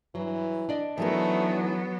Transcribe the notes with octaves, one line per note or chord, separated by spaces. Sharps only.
G2 E3 F#3
D4 D5 D#5
E3 F#3 A3 B3 D#4 A#4